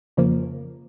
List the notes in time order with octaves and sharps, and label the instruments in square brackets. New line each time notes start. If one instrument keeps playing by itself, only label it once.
[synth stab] F2 C#3 F3 A#3